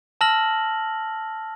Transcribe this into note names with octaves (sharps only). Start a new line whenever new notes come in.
A5 E6 F6 A#6 F#7